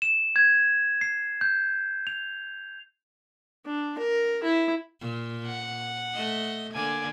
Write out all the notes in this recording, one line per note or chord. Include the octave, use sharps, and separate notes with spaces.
E7
G#6
C7
G6
F7
D4
A#4
E4
A#2
F#5
A3 D#5
D3 A#3 D5 G#5